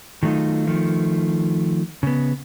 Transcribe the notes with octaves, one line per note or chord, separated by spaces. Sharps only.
D#3 F#3 A3 D#4 F4
D#3 F3 A3
C#3 B3